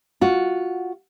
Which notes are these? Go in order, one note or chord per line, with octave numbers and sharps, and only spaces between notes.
F4 F#4